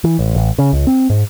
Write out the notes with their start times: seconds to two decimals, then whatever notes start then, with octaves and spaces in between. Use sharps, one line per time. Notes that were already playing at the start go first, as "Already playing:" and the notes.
0.04 E3
0.19 A1
0.35 A1
0.58 C#3
0.73 C#2
0.87 C4
1.10 G#2